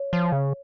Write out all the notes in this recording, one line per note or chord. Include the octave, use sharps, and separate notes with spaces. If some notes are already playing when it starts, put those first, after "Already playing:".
Already playing: C#5
F3
C#3